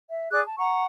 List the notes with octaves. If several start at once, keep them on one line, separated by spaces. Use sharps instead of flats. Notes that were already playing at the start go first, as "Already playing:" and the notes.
E5
G#4 D5 D6 F#6
A5
F#5 A#5 C#6